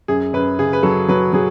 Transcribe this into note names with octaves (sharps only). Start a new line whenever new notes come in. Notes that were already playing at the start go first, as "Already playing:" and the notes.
F#2 G#4
F#2 B4
C#3 G#4
B4
F#3 A4
F#3 B4
F#3 G#4